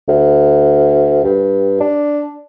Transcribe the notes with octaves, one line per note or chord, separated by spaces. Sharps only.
D2
G2
D4